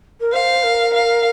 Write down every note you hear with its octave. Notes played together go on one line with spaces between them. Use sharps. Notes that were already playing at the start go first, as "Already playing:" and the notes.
A#4
C5 F5
A#4
F5